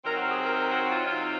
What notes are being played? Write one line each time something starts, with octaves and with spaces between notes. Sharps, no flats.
C3 F#3 C4 D#4 A#4
F#4
G#4
A#4
A#4
F#4
F4
C3 F#3 C4 D#4 F4